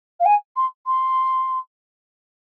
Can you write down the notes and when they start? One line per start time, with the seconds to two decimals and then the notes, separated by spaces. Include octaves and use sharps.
0.20 F5
0.25 G#5
0.56 C6
0.86 C6